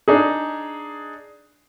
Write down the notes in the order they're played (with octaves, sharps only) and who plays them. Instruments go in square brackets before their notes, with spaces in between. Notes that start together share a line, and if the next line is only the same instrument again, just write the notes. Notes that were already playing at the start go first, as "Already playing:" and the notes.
[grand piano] D4 D#4 G#4